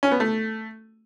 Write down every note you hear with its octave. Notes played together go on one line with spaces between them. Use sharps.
C#4
B3
A3